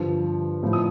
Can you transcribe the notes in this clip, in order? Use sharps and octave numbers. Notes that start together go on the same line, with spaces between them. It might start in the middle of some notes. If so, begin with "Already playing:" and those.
Already playing: G2 D3 F3
A2 F3
D#6